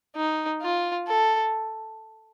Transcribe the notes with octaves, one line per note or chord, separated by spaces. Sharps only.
D#4
F4
A4